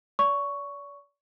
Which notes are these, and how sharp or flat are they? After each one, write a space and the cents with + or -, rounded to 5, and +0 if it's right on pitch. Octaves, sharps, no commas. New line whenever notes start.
D5 -40 C#6 +5